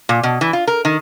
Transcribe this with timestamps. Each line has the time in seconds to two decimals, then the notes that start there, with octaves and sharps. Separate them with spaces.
0.09 A#2
0.23 B2
0.41 E3
0.53 F4
0.67 A#4
0.85 D#3